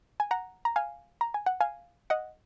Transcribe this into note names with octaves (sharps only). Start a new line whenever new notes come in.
G#5
F#5 A#5
A#5
F5 G#5
A#5
G#5
F#5
F5 G#5
D#5 F#5